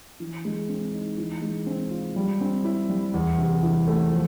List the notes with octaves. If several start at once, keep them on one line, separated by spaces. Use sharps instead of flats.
E3
G#3
C4
D#4
E3
G#3
C4
F4
G3
C4
E4
G3
E2
C3
E3
A3
F3